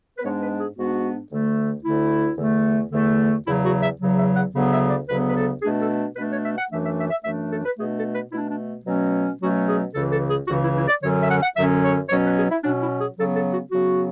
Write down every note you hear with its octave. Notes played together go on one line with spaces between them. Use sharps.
B4
G#2 G#3 B3 D4 C#5
B4
G#4
G#2 G#3 B3 D4 F#4
D2 D3 A3
D2 D3 A3 E4
E2 D3 A3
E2 D3 A3
E2 C#3 F#3 E4
F#4
E5
E2 C#3 F#3
E5
F#5
D2 C#3 F#3 B3
E5
D5
D2 C#3 F#3 B3 B4
B4
A4
B2 A3 D4 G#4
A4
B2 A3 D4 B4
C#5
E5
F#5
F#2 E3 A3 D4 E5
E5
E5
E5
F#2 E3 A3 D4 E5
A4
B4
B2 A3 D4 G#4
A4
B4
B2 A3 D4 E4
D4
B2 F#3 A3 C#4
B2 F#3 A3 C#4 F#4
G#4
C#2 C#3 E3 A4
A4
G#4
C#2 C#3 E3 F#4
E4
E4
D5
F#2 D3 F#3 C#4 C#5
E5
F#5
F#5
F#2 D3 F#3 C#4 E5
C#5
B2 F#3 C#4 C#5
B4
G#4
E4
B2 F#3 C#4 D4
E4
G#4
C#3 F#3 B3 A4
A4
F#4
C#3 F#3 B3 F#4